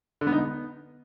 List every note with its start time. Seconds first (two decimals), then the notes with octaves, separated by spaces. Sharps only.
0.21 D3
0.27 B3
0.33 D#4
0.38 B3